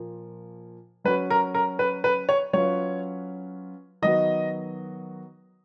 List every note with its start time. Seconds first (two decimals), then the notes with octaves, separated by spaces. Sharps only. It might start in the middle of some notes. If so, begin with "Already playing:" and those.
Already playing: A#2 F3 A#3
1.04 F#3 C#4 F#4 B4 C#5
1.30 A#4
1.55 A#4
1.79 B4
2.04 B4
2.29 C#5
2.53 F#3 C#4 F4 B4 C#5
4.02 D#3 F#3 B3 F#4 D#5